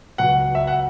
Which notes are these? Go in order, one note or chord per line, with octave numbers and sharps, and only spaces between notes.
C#2 B2 F#3 F#5
E5
F#5